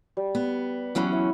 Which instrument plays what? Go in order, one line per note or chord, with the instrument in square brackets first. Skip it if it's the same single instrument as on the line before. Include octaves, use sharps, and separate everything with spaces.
[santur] G3
[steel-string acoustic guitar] B3
[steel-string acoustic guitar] E3 F#3 C#4 [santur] F#5 B5 E6
[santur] E5